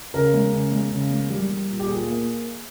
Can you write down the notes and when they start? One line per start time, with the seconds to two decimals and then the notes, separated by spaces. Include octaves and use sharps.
0.14 C#3 A#4
0.33 G#3
0.53 C#3
0.72 G#3
0.91 C#3
1.10 G#3
1.30 G3
1.49 G3
1.68 A#2
1.80 G4
1.87 A#2 G#4
2.07 A#3